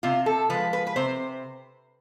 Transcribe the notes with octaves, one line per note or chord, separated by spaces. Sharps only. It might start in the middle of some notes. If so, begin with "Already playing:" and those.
C3 F4
A4
F3 G#3 B4
B4
B4
C3 C5